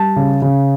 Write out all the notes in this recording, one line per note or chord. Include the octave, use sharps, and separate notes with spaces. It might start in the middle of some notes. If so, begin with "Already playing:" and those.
Already playing: G3 A5
C#3
C#3